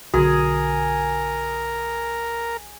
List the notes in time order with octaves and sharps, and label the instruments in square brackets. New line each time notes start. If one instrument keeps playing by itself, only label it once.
[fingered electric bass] B1 D3 [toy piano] F#4 [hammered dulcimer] G#4 [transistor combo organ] A#4